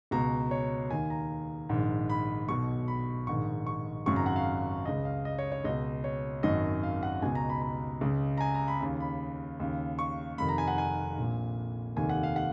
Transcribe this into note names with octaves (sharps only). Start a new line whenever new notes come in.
C#2 B2 A#5
C#5
D#2 D#3 G#5
A#5
A#1 G#2 D#3
B5
B1 B2 C#6
B5
A#1 G#2 D#3 C#6
C#6
G#1 F#2 C#3 C#6
A#5
F#5
F5
C#2 C#3 D#5
F5
D#5
C#5
C#5
C#2 B2 D#5
C#5
G#1 F#2 D#3 D#5
F5
F#5
C#2 B2 G#5
A#5
B5
B5
C#2 C#3
A#5
G#5
A#5
B5
D#2 C#3
B5
D#2 C#3
C#6
F1 F2 D#3 B5
A#5
G#5
F#5
G#5
A#1 A#2
F1 D#2 D#3 G#5
F#5
F5
F#5